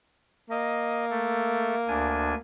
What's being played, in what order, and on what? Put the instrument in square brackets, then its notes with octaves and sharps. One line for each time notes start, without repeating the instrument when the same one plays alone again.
[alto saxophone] A#3 [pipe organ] D#5
[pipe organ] A3 A4
D2 D4 G#5